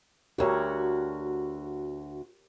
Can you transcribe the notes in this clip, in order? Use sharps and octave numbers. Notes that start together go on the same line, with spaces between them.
D2 F#4 G4 A#4 C#5